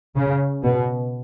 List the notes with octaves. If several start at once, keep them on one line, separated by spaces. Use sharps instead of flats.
C#3
B2